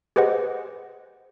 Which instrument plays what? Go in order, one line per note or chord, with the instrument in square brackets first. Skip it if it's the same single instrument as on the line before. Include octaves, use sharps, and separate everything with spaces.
[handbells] G4 G#4 B4 C5 D#5 F#5